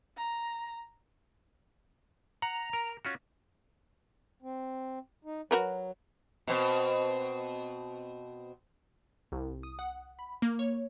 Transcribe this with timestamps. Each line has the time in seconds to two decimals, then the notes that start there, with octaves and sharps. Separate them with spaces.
0.17 A#5
2.42 F#5 A#5
2.73 A#4
3.05 C#4 F4 F#4
4.42 C4
5.25 D#4
5.51 F#3 F#4 A#4 B4
6.47 B2 C4
9.32 C2
9.63 D#6
9.79 F#5
10.19 B5
10.42 A#3
10.59 C#5